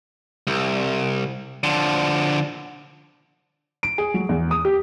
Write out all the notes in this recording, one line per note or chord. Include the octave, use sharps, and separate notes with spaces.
C2
D3 F3
D7
G#4
F#3
E2
D#6
G4